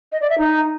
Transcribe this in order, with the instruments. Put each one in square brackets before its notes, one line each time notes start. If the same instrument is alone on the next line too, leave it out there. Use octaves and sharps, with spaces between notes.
[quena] D#5
D5
E5
D#4